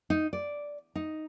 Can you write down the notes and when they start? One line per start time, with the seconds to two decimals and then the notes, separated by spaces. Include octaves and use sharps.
0.10 D#4
0.33 D5
0.95 D#4